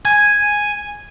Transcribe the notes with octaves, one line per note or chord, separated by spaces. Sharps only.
G#5 G#6